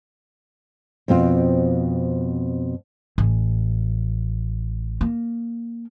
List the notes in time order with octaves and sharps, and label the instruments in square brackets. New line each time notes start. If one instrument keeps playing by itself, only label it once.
[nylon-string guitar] F2 B2 C4 F4
[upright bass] A1
A#3